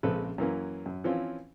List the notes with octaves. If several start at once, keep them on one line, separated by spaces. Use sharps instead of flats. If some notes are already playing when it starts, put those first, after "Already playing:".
A#1 C#3 G#3 C4 A4 B4
F#2 E3 A#3 C#4
F#2
E3 F3 C4 C#4 F4